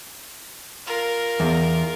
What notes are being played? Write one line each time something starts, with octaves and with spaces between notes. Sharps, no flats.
F4 A#4
E2